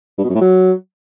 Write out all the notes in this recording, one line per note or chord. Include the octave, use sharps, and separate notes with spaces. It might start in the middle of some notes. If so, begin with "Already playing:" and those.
G2
B2
F#2
A2
F#3